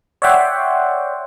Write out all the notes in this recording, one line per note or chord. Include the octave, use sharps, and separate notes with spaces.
C#5 D5 E5 F#5 G5 C6